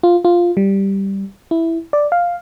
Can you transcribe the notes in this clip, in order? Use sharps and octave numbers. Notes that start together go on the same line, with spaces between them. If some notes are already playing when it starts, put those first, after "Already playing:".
F4
F4
G3
E4
D5
F5